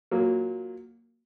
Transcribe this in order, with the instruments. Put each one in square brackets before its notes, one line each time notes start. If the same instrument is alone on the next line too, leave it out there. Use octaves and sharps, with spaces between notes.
[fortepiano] A#2 F#3 A#3